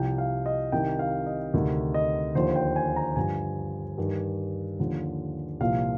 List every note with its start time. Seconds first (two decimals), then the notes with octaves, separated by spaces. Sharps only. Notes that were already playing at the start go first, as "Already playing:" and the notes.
Already playing: C2 C3 F3 G5
0.18 F5
0.46 D#5
0.72 C2 C3 D#3 G5
0.99 F5
1.26 D#5
1.54 D2 C3 D#3
1.94 D#5
2.35 D#2 D3 F3 C5
2.56 G5
2.76 G#5
2.96 A#5
3.16 G2 D3 F3 G#5
3.98 G2 D#3
4.79 D#2 D3 F3
5.60 C2 A#2 F3 F5